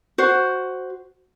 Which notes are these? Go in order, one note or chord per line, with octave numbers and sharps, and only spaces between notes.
F#4 C5